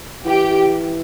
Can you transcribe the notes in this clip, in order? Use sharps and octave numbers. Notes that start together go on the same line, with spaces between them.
E3 G4